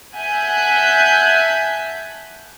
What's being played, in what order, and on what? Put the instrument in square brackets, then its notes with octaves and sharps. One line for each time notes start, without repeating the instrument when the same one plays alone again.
[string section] E5 F#5 G#5 A5 F#6 G6